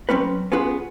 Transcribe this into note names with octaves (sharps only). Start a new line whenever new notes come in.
F#3 G#3 C4 C#4 B4
B3 C#4 F4 G#4 B4